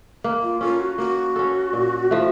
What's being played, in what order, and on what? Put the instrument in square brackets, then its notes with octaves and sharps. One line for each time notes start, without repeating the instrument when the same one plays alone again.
[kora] A#3
[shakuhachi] F4
[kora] C#4 A4 [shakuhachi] F4
[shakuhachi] F#4
[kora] A#3 [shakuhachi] F#4
[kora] C#4 A4
A#2
F3 A3